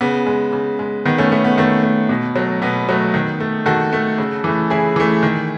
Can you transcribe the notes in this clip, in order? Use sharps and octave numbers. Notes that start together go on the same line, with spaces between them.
C#3 B3
G#3
C#3
G#3
D#3 B3
A3 C#4
A3 B3
B3
D#3 A3
A3
B2
F#3 A3
B2 B3
F#3 A3
D#3
A3
D#3 F#4 A4
A3
C#3
E3 A3
C#3 E4 G#4
E3 A3
D#3